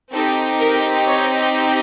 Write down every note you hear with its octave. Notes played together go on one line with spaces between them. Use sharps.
C4 D#4 G4 A4
A#4
C#5